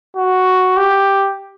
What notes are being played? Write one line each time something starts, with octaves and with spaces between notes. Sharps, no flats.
F#4
G4